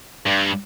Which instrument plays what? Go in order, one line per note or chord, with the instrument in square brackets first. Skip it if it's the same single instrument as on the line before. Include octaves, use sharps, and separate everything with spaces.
[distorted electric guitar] G2